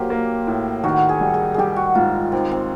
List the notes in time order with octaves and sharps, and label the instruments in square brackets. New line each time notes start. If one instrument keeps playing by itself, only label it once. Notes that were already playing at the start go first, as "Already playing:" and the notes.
Already playing: [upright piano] F#3 A#3 [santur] G4 C5
[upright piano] A#3
A2
[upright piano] D#3 [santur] F#4
[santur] G#4
[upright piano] G3
[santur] G#4
[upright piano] G3 [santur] G4 G#4
[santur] F#4
[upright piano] G#2 [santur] F4
[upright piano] D#2 [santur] C4
[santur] C4